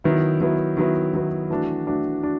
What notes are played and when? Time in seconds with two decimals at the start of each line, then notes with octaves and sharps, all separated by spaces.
0.04 D#3 F#3 B3 E4
0.40 D#3 F#3 B3 E4
0.77 D#3 F#3 B3 E4
1.13 D#3 F#3 B3 E4
1.50 E3 A3 D4 F#4
1.86 E3 A3 D4 F#4
2.23 D4 F#4